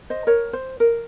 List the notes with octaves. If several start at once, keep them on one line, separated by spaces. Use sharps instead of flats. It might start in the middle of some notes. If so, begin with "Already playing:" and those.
C5 D#5
A#4 C#5
C5
A#4